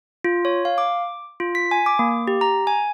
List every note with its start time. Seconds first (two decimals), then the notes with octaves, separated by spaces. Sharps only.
0.24 F4
0.45 C#5
0.65 F5
0.78 D6
1.40 F4
1.55 B6
1.71 G#5
1.86 D6
1.99 A#3
2.28 G4
2.41 A#5
2.67 G#5